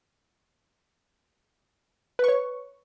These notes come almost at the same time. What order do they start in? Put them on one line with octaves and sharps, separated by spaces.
B4 C#6 C#5